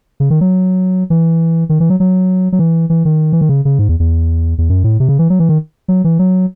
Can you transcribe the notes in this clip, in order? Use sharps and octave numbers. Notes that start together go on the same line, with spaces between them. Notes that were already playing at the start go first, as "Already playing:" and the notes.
C#3
D#3
F#3
E3
D#3
E3
F#3
F#3
F#3
E3
E3
D#3
E3
D#3
C#3
C#3
G#2
E2
E2
E2
F#2
A2
C3
C#3
E3
F#3
E3
D#3
F#3
E3
F#3